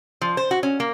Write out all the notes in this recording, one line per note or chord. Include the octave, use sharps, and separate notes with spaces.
F3
C5
F#4
C#4
A#3